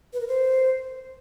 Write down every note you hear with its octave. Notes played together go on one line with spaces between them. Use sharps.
B4
A#4
C5